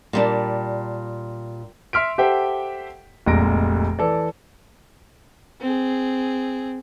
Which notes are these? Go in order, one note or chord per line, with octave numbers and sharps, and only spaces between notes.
A#2 G3 D4
E5 C6 F6 B6 D7
G4 A4 C5 E5 F#5 G5
F1 C2 A#2 G#3 A#6 D7
E3 A4 D5
C4 G#4